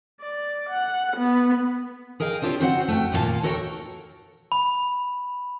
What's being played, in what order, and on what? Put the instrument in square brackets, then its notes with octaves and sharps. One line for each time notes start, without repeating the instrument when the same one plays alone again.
[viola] D5
F#5
B3
[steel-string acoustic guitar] G#4 A#4 D#5 F5 G5
C4 D4 F4 G4 C#5
C#3 C4 F#4 C5 D#5 F#5
A3 F#4 G5
D#2 A#2 F4 F5 A5
F#4 A4 A#4 C#5 E5 G5
[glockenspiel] B5